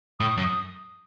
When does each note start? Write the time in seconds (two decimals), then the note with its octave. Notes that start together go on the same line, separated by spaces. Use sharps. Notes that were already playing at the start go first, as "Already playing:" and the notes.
0.20 A2 D#6
0.37 F#2
0.43 D#6